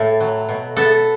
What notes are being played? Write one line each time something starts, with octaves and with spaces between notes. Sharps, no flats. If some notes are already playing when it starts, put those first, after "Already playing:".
Already playing: A2 A4
F#3
B2
B3 A4